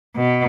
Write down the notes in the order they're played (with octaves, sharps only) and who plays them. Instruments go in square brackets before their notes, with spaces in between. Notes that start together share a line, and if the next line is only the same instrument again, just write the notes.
[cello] B2